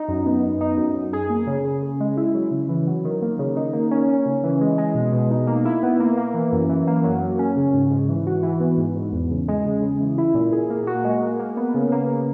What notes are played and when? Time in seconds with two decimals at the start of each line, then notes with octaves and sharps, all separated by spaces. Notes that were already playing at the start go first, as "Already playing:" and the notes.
Already playing: D#4
0.08 F#2
0.26 B3
0.42 D#4
0.61 D#4
0.77 F#2
0.94 F#2
1.13 G#4
1.30 A#3
1.47 C#3
1.64 C#3
1.83 C#3
2.00 G#3
2.17 E4
2.34 F#3
2.51 C#3
2.69 E3
2.87 F#3
3.04 D#3
3.22 A#3
3.39 C#3
3.56 D#4
3.73 A#3
3.91 C#4
4.09 C#4
4.26 C#3
4.43 E3
4.61 G#3
4.78 G#3
4.95 B2
5.12 B2
5.31 D#4
5.47 A#3
5.65 E4
5.83 B3
6.00 A#3
6.17 A#3
6.34 E3
6.52 F#2
6.69 E3
6.87 A#3
7.03 F#3
7.22 A#3
7.39 C#4
7.56 C#3
7.73 G#2
7.90 G#2
8.08 E3
8.26 F#4
8.43 E3
8.60 B3
8.77 G#2
8.95 G#2
9.12 E2
9.30 C#3
9.48 G#3
9.65 C#3
9.82 C#3
10.00 E3
10.18 E4
10.34 A#2
10.52 G#4
10.70 A#3
10.87 F#4
11.04 G#3
11.22 A#3
11.39 A#3
11.57 B3
11.74 C#3
11.92 A#3
12.08 A#3